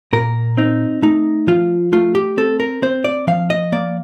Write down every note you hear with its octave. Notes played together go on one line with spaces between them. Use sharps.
A#2 A#4
C4 D#4
A3 D#4
F3 F4
A3 F4
G4
C4 A4
A#4
C4 C5
D5
F3 F5
D#5
A#3 D5